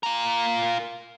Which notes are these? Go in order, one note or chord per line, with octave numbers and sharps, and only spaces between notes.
F4 A#4